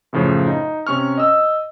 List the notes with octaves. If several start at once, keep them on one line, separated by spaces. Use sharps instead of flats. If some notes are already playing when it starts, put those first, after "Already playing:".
F#2 A2 C#3 F3
D#4
C3 C#4 C#6 F6
D#5 E6